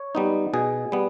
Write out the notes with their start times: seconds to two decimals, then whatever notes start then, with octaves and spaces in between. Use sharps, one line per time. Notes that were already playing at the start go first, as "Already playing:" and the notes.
Already playing: C#5
0.15 G3 B3 D#4
0.54 B2 G#4
0.92 G3 B3